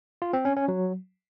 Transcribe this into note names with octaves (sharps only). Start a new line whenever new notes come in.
F4
C4
C#4
C#4
F#3